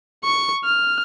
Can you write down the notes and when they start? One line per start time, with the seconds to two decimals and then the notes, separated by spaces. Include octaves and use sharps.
0.24 C#6 C#7
0.64 F6